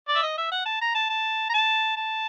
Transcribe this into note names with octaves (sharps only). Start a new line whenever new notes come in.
D5
E5
D#5
E5
F#5
A5
A#5
A5
A5
A#5
A5
A5